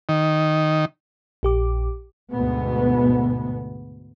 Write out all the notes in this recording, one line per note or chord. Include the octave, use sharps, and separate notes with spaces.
D#3
A#1 G4 D6
D2 G#2 B2 B3